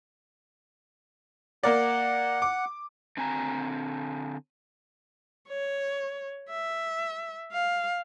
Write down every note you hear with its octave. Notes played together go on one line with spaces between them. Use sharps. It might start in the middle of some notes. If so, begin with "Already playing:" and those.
A#3 A#4 D5 F#5
D6
D3 C4 G#5 A#5
C#5
E5
F5